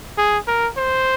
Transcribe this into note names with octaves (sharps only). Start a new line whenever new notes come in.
G#4
A#4
C5